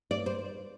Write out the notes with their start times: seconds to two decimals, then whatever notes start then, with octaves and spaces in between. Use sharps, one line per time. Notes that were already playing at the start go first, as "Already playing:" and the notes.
0.11 D5
0.26 C5